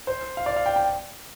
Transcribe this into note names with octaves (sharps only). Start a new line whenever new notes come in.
C5
F5
D5
F5
G5
G5